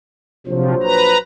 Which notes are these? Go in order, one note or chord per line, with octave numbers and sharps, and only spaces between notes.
A#1 C3 F3 F#3 C5
B4 A#5